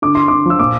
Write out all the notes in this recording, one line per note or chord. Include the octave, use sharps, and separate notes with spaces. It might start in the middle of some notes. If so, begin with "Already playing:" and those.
D3 D6
D3 C6
D3 D6
F3 E6
A#2 D6